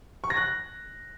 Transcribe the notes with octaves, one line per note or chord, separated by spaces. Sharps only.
C#6
A#6
F#6